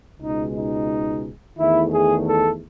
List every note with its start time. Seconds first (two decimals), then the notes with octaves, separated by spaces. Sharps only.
0.21 C#2 B2 G#3 D#4
0.55 D#4
1.57 E2 D#3 A3 E4
1.91 G#4
2.25 A4